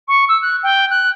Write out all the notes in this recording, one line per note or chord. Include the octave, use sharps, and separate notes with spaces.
C#6
E6
F#6
G5
F#6